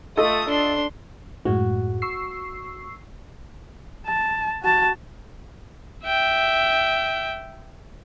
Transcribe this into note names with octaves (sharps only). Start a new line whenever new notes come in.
A3 F4 A4 D#5 D#6
D4 C6
F#2 A2 G#3 F#4
C#6 E6 C7
A5
F#4 A5
E5 G5